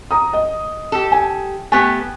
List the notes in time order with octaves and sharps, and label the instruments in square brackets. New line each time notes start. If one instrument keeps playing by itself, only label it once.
[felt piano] A#5 D#6
D#5
[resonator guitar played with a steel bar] G4 A4
[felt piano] G#5
[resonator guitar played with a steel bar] A3 B3 G4 [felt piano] G#5